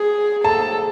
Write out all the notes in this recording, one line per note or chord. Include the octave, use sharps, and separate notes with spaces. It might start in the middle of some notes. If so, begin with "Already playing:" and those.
Already playing: G#4
A4 A5